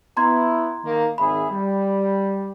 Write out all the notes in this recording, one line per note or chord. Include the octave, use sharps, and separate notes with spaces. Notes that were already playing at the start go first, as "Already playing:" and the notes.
B3 E4 A#5 C6 G#6
D#3 A#3
G#1 G#4 E5 B5
G3